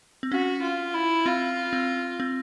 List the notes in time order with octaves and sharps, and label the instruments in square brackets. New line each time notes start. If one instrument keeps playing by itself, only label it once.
[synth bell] C4
[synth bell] C#4 [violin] F#4
[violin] F4
E4
[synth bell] C4 [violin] F4
[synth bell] C4
C4